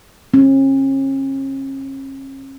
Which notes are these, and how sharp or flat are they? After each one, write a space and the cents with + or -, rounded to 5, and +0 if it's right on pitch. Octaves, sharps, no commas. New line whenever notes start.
C#4 -40